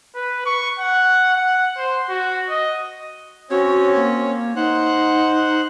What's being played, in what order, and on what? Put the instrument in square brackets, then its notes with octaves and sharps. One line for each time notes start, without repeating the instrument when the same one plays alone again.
[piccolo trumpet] B4
C#6
F#5
F#5
C5
F#4
D#5
[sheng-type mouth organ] C4 C#4 C#5 [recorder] F#4
[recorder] A#3
[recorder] D#4 [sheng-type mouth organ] C5 F#5